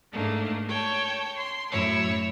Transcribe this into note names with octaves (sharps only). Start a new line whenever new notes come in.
G#2 A3 A#3 D4
C#5 G5 A5
C6
F#2 A2 E4 C#5 E6